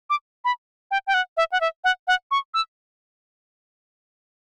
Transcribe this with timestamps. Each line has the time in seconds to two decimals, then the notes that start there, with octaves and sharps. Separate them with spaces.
0.10 D6
0.45 B5
0.91 G5
1.07 G5
1.14 F#5
1.37 E5
1.52 F#5
1.61 E5
1.84 F#5
2.08 F#5
2.31 C#6
2.54 E6